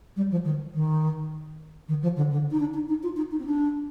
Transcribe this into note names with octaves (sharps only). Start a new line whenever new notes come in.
G3
F3
D#3
D#3
D#3
F3
D3
D3
D#4
D4
D#4
D#4
F4
D#4
D#4
C4
D4